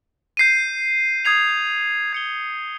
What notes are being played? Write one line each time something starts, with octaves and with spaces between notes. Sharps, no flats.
G6 C7 D#7
D#6 G#6 C7 F7
G#6 C#7 G7